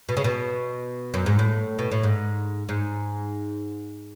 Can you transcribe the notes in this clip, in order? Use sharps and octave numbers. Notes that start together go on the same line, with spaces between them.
B2
C#3
B2
F#2
G#2
A2
B2
A2
G#2
G#2